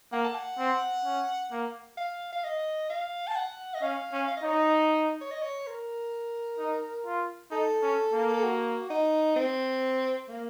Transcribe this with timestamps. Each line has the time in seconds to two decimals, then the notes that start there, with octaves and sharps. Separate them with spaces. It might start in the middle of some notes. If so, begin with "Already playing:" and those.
0.12 A#3 F#5
0.24 A5
0.35 F#5
0.58 C4
1.04 C#4
1.52 A#3
1.97 F5
2.32 F5
2.44 D#5
2.90 F5
3.27 A5
3.35 F#5
3.74 D#5
3.82 C#4 F5
4.13 C#4
4.28 F5
4.37 D#5
4.43 D#4 C#5
4.52 D#5
5.21 C#5
5.31 D#5
5.42 C#5
5.67 A#4
6.58 D#4
7.06 F4
7.51 D#4 A4
7.82 C#4
8.13 A#3
8.33 A4
8.44 F#4
8.90 D#4
9.36 C4
10.29 A#3